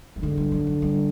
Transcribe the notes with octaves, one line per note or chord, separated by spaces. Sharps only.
G3
D3 G#3
G3
F#3
F#3
G3